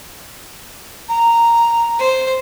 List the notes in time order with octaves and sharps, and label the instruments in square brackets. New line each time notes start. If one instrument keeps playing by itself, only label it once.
[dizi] A#5
[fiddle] C5